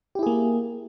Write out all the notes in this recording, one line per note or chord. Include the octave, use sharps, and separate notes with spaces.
A#3 E4 G4 G#4